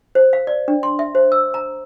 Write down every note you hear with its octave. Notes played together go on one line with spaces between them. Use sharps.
C5
F5
D5
D4
C6
E5
C5
E6
A#5